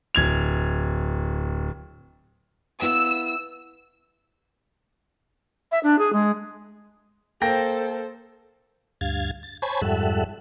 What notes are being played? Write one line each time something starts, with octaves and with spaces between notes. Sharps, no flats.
D1 G#6 F7
B3 E4 F5 E6
E5
D4
G#4
G#3
A#3 A4 C5 G5 A#6
D2 G2 F5 G#6 A6
A6
C5 C#5 G#5 A5 B5 C#6
F2 G#2 G3 A4 E5 F#5